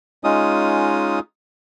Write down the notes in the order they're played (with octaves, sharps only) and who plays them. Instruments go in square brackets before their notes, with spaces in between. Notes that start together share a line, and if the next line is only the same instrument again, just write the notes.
[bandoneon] G#3 C#4 D#4 F4 D#6